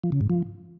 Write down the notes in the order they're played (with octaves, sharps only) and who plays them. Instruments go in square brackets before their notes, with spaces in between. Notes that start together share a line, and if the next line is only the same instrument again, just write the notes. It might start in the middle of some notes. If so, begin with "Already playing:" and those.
[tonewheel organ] F3
C#3
G#2
F3